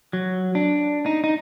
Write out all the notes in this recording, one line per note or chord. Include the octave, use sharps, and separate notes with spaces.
F#3
D4
D#4
D#4